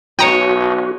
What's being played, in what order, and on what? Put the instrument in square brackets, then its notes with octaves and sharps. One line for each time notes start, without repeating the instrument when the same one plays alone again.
[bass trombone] B1 [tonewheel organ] F#4 [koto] C#5 D#5 [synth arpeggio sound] G5 A#5